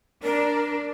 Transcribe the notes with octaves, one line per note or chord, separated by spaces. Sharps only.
D4 A#4